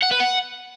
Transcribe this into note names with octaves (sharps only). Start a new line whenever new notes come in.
F#5
B4
F#5